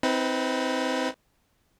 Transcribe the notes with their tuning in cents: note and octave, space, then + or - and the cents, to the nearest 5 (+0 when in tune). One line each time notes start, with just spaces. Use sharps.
C4 -5 D#4 +40 B4 +10